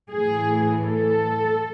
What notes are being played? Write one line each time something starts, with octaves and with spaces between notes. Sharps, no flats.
A2 E3 G#4
A4